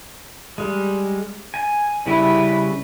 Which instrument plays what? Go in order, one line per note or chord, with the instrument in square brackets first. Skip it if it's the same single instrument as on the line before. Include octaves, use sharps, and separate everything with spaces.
[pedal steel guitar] G3 G#3
G#5
[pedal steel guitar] C#3 G3 B4 [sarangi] E4